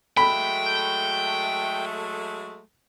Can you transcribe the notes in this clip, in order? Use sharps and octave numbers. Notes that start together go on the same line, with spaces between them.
F#3 G#3 A3 G5 B5